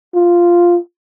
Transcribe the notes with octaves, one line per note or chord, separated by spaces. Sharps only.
F4